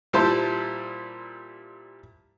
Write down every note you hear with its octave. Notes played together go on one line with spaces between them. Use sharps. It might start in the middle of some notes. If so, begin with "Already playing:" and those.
A#2 G3 E4 C5 A5 C6